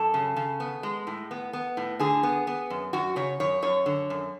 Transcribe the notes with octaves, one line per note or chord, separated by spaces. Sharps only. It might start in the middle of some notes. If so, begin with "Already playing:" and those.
Already playing: F#2 A4
C#3
C#3
B3
G#3
A2
B3
B3
A2
D3 G#4
B3
B3
F#2
F#2 F#4
C#3 C#5
F#2 C#5
F#2 C#5
D3
F#2